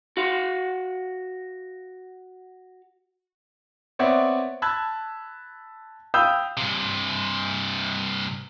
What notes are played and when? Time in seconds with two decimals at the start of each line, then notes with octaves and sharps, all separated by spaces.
0.17 F#4 F5
3.99 B3 C4 C#5 D5 E5 F#5
4.62 A5 B5 E6 F#6 G#6
6.14 F5 G5 B5 D#6 E6 G6
6.57 G2 C3